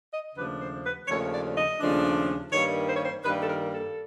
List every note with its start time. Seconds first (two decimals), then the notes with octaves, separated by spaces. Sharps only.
0.11 D#5
0.35 D#2 C#3 F3 A3 D4 B4
0.59 C5
0.83 B4
1.07 D#2 C#3 F3 A3 D4 C#5
1.32 D5
1.55 D#5
1.80 D#2 C#3 F3 A3 D4
2.52 G2 D#3 G3 A#3 C#5
2.88 C5
2.95 C#5
3.02 C5
3.24 G2 D#3 G3 A#3 B4
3.40 A4
3.47 A#4
3.73 A4